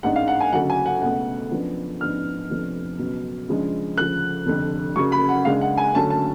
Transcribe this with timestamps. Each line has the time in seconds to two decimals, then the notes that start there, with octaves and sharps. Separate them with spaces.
0.03 A1 G#2 G#3 D4 F#5
0.16 F5
0.28 F#5
0.40 G#5
0.53 D2 C#3 F#3 F#5
0.70 G#5
0.86 F#5
1.02 C#2 B2 A3 F#5
1.51 F#2 F3 B3 D4
2.00 A1 G#2 F3 B3 D4 F6
2.49 F1 F2 F3 B3 D4
2.98 C#2 B2 F#3 B3
3.48 C#2 C#3 F3 G#3 D4
3.97 D2 C#3 F3 F#6
4.46 F1 F2 D3
4.96 F#1 F#2 C#3 F#3 C#6
5.12 B5
5.29 F#5
5.45 C#2 C#3 G#3 D4 F5
5.61 F#5
5.78 G#5
5.94 D2 D3 F#3 A3 C#4 A5
6.10 A5